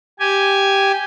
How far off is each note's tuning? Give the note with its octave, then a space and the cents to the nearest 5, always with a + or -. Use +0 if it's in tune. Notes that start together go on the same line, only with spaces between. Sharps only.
G4 +0 G#5 +0